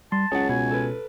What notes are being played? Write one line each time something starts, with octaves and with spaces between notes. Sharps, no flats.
G3 A5 C6
C#2 C#4 G#4 C#5 F#5
B2 G#5
A4 B4